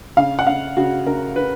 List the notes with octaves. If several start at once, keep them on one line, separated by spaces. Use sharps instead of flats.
C#3 F5
F#5
C#3 F5
C#3 F#4
C#3 A#4
C#3 B4